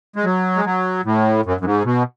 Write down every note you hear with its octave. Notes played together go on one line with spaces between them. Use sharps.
G#3
F#3
G#3
F#3
A2
F#2
F#2
G#2
B2